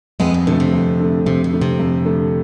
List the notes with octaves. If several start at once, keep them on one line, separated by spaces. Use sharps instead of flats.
F2 G#3 B3
B2 D3
B2 D3 A3
C3
F2
D3 A3
F2 C3
B2
D3 A3
C3
F2
D3 A3